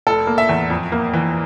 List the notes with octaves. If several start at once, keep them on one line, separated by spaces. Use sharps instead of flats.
F1 A4
A#3
E5
E2
F2
A#3
E3